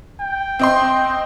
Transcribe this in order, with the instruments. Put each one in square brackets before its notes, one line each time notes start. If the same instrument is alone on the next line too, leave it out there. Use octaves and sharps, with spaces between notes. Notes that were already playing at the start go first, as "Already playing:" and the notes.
[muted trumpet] G5
[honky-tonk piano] C4 D#5 C6